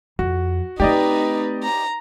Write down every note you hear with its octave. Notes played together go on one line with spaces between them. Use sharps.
F2 F#4
A3 C4 D#4 G4 B4 D5 D#5
A#5